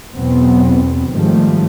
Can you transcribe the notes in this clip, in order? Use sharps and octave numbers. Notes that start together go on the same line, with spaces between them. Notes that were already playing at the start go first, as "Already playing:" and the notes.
E2 B2 F#3 B3 C4
G#2 D#3 F3 G3 A3